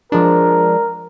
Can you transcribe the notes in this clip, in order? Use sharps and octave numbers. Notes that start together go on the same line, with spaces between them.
F3 G#3 D4 A#4